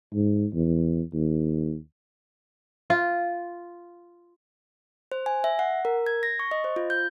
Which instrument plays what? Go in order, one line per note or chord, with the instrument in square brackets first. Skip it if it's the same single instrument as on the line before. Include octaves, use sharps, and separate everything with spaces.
[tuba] G#2
E2
D#2
[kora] F4
[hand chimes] C5
G#5
E5
F#5
A#4
G#6
A#6
C#6
D#5
C5
F4
G6